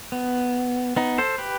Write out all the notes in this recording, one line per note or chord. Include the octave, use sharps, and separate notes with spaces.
B3
B3 D#4
A4 C5
G4 B4